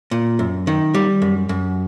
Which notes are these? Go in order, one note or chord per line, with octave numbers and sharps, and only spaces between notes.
A#2
F#2
D#3
G3
F#2
F#2